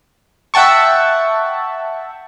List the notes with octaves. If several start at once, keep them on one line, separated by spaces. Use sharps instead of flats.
E5 F#5 G5 A5 C#6